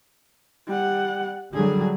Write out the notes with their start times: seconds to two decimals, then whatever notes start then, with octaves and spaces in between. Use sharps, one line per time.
0.68 G3 F#5
1.53 D3 F#3 G3 G#4